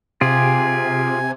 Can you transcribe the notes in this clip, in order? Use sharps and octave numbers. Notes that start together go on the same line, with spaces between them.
C3 F4 G4 G#4 G#5